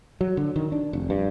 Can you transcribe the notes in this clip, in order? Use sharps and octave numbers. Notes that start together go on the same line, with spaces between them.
F#3
D3
D#3
D4
F1
G2